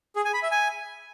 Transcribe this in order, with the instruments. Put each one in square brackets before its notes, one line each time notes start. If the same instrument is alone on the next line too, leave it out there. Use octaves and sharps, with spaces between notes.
[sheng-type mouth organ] G#4
G#5
B5
E5
G#5